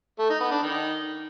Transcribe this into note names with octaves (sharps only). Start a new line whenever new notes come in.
A3
D#4
B3
D4
D#3